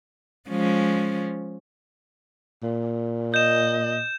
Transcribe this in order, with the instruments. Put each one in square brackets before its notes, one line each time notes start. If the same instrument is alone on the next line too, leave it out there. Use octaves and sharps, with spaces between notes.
[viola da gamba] F3 G#3 C#4
[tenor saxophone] A#2
[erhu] D#5 [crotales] G6 E7